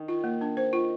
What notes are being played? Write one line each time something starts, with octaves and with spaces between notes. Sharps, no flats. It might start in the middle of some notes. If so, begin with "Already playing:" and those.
Already playing: D#3
F4
A#3
D4
C5
F4